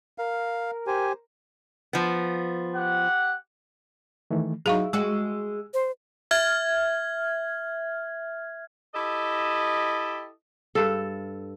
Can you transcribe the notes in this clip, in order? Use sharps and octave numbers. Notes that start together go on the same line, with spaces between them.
A#4 F5
G4 C5 G#5
F3 B3
G4 F#5
D#3 E3 A3
F#3 D#4 E4 G#4 F5 C#6
G#3 F#4 E6
C5
E5 F6 G#6
E4 G4 A4 D#5
G2 A4